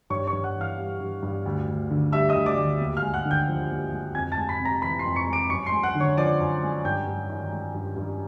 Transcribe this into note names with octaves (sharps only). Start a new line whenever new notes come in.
G2 C#5 C#6
C#5 C#6
G2
F#5 F#6
E3 F5 F6
G3
G2
G2
D2
D2
D3
G3 E5 E6
D#5 D#6
D2
D5 D6
D2
D#2
F5 F6
G#3
F#5 F#6
D3
G5 G6
F3
D#2
G#3
F2 G#5 G#6
A5 A6
G#3
B5 B6
C3
A#5 A#6
E3 B5 B6
C6 C7
F2
C#6 C#7
G#3
D6 D7
F#2 C#6 C#7
C6 C7
G#3
F#5 F#6
D3
C#5 C#6
F3 D5 D6
F#2
G#3
G2 G5 G6
G2
D#3
G#3
G2
G2